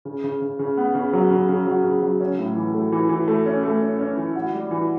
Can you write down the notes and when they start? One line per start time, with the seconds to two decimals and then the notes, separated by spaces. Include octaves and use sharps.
0.05 C#3
0.24 C#3
0.41 C#3
0.59 C#3
0.77 B3
0.95 C#3
1.13 F#3
1.30 C#3
1.49 C#3
1.66 F#3
1.84 C#3
2.02 F#3
2.20 C#4
2.38 A2
2.56 E3
2.74 A3
2.92 E3
3.09 E3
3.28 A3
3.46 C#4
3.63 A3
3.81 C#4
3.99 C#4
4.17 E3
4.35 F#4
4.53 G3
4.71 E3